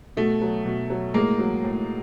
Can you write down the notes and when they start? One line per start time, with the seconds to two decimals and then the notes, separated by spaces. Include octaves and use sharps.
0.17 B2 A3
0.42 F#3
0.65 B2
0.90 F#3
1.14 A2 G#3 A#3
1.39 F#3
1.64 A2